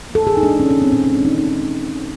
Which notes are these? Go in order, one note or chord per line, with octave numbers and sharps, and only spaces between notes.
A#3
A4
E3 G#4
D#4
G#3 D4
D#3 C#4
C#4
D#3
C4
A#2 C#4
G#3 C#4
D4
D#3 D#4
D#4